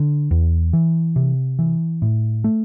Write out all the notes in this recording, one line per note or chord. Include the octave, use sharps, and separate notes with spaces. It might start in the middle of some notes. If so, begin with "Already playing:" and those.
Already playing: D3
E2
E3
C3
E3
A2
A3